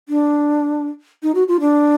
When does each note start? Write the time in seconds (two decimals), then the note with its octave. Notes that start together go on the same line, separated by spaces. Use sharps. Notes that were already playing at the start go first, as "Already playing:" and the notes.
0.09 D4
1.23 D#4
1.35 F#4
1.48 F4
1.60 D4